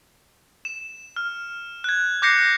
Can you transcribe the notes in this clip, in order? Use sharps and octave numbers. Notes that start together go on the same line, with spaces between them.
E7
F6
F#6 G#6
D6 F#6 G6 A#6 C7 C#7